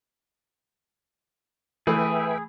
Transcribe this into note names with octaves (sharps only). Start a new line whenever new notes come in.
E3 A3 G#4 B4 E5 G5